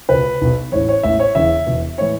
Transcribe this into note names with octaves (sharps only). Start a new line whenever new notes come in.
C#2 B2 B4
B1 B2
A1 A2 E3 C#5
C#5
A1 A2 E3 E5
C#5
E1 E2 C#3 E3 E5
E1 E2 B2
A2 E3 C#5